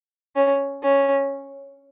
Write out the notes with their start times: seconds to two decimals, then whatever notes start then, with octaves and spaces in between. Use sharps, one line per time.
0.35 C#4
0.82 C#4